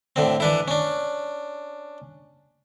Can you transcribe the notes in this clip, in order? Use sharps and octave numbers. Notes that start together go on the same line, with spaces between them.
A2 D3 C4
E3 D4 E4
C#4 D4